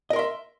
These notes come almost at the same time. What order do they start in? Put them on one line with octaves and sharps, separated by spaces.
D#5 A#4 C6 E5